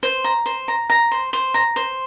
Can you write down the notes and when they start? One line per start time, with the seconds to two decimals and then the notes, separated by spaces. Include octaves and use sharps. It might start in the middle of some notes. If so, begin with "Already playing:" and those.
0.03 C5
0.24 A#5
0.46 C5
0.68 A#5
0.90 A#5
1.12 C5
1.33 C5
1.54 A#5
1.76 C5